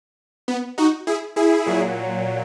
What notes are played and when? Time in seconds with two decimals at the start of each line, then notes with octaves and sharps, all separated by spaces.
0.48 B3
0.78 D#4 F#4
1.07 E4 G#4
1.36 E4 G#4
1.66 A#2 F#3